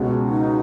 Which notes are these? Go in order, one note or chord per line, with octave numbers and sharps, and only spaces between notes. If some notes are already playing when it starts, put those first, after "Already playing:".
Already playing: C#2 B2 G#3 C#4 F#4
D#4